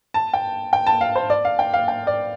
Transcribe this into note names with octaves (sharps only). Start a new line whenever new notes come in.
A5
G5
G5
A5
F5
C5
D5
F5
G5
F5
G5
D5